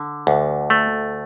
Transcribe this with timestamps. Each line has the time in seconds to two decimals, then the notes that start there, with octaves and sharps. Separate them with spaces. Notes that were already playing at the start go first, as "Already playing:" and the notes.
Already playing: D3
0.27 D2
0.70 A3